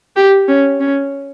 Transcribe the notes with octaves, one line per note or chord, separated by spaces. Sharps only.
G4
C#4
C#4